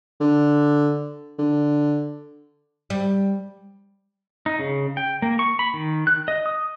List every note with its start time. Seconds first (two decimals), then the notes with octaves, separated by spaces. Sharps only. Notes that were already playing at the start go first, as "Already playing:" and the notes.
0.20 D3
1.39 D3
2.90 G3
4.46 D#4
4.59 C#3
4.97 G5
5.22 A#3
5.39 C#6
5.59 B5
5.74 D#3
6.07 F#6
6.28 D#5
6.46 D#6